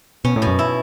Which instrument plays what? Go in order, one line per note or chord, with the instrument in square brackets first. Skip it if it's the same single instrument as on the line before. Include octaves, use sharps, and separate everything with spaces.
[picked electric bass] B2 [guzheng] C#4
[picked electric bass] A2
[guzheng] B2
[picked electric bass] F#2
[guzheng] E4